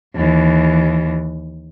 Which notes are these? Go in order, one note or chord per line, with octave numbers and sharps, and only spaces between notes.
D#2 E3